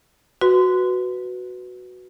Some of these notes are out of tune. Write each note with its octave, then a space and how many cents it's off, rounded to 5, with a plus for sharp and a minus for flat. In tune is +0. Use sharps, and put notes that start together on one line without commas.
F#4 +0 B4 +0 C6 -25